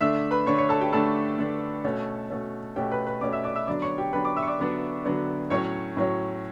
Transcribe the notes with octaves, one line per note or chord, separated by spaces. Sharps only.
D3 A3 D4 E5 E6
B4 B5
D3 A3 D4 C#5 C#6
C#5 C#6
A4 A5
G4 G5
D3 A3 D4 A4 A5
D3 A3 D4
B2 A3 C#4
B2 A3 C#4
B2 A3 C#4 G4 G5
B4 B5
B4 B5
B2 A3 C#4 D5 D6
E5 E6
D5 D6
E5 E6
D3 F#3 B3 D4 D5 D6
C#5 C#6
G4 G5
D3 F#3 B3 D4 B4 B5
D5 D6
E5 E6
C#6
D5 D6
D3 F#3 B3 D4
D3 F#3 B3 D4
A2 F#3 C#4 C#5 C#6
A2 F#3 C#4